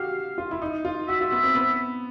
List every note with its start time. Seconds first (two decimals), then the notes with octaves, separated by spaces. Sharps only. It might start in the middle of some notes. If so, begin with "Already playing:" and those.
Already playing: F#4 G4 F5
0.38 F4
0.51 E4
0.62 D#4
0.85 F4
1.08 F#4 E5
1.21 F4
1.32 B3
1.43 C4
1.55 B3